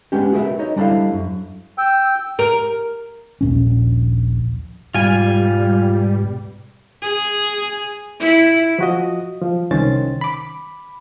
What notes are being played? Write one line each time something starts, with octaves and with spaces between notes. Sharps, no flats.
G#3 B3 C#4 D4 G4
F#4 G#4 A#4 B4 E5
D#4 C#5 D#5
G3 D4 E4 A4 C5 F5
F#2
G5 E6
A#4
D#1 A#1 C#4
G#2 B2 G3 F4 G#5
G#4
E4
F3 F#4 D#5
F3
C2 D#3 C#4 C5 A6
B5 D6